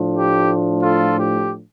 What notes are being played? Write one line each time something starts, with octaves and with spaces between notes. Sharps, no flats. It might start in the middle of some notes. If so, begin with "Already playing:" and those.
Already playing: A2 F3 A3 D4
G4
F4 A4
G4